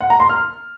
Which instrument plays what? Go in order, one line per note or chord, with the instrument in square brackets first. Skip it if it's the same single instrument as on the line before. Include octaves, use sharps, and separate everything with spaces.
[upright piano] F#5
A#5
C6
F6